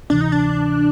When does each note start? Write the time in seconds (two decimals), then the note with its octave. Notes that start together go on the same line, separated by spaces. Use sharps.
0.10 D2 C3 E3 D4
0.21 D#4
0.32 D4